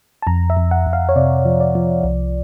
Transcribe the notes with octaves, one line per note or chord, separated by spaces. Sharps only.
A5
F2 A#5
E5
F2
F#5
F2
F5
C#5
C3 D5
F3
D5
F3
C2